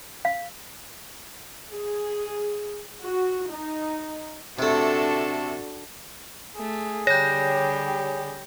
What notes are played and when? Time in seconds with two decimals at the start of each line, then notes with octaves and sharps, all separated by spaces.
0.25 F5
1.70 G#4
3.02 F#4
3.50 D#4
4.59 C3 A3 D4 F#4 A4
6.56 A3 G#4
7.07 D3 G3 G4 C#5 G6 A#6